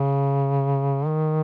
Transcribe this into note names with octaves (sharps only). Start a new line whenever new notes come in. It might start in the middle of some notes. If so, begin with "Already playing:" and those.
Already playing: C#3
D#3